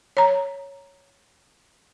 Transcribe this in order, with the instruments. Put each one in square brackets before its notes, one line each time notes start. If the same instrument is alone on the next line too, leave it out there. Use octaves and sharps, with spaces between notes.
[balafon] C#5 A#5